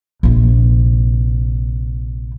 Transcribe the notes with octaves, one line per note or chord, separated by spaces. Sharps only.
A#1 C3